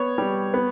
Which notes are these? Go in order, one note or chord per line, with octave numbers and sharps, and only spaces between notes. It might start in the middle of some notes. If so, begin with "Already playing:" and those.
Already playing: B3 C#5
G3
B3